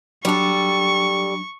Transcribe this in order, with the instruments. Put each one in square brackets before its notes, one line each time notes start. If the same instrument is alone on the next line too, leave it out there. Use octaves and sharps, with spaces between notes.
[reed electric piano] F#3 D4 [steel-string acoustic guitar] G3 A4 [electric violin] C#6